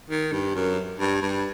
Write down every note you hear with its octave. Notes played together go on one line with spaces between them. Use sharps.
D#3
G2
F#2
G2
G2